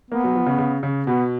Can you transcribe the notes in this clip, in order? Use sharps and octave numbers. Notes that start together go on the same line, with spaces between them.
A#3 B3
F#3
F3
C#3
C#3
C#3
B2 B3